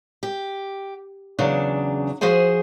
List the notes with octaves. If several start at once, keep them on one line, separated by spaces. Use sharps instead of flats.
G4
E2 C#3 F#3 D4
F3 F#4 G#4 C5 G#5